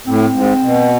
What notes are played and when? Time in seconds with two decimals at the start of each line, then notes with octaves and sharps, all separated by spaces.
0.07 A2 C4
0.34 G#2
0.62 B2